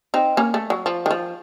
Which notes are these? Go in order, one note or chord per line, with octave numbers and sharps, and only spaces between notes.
C4 D#4
A#3 C#4
A3
F#3
F3
D#3
F3